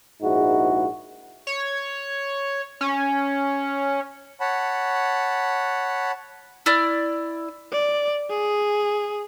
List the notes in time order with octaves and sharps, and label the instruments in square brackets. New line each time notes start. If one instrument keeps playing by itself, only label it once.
[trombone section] A#1 G#2 G#3 D#4 E4 F#4
[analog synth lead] C#5
C#4
[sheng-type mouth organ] C#5 F#5 A5 B5
[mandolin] E4 D5 F6
[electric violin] D5
G#4